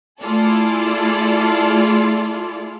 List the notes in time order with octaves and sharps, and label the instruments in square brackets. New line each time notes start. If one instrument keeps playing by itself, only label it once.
[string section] A3 E4 F4 G#4 A4 D5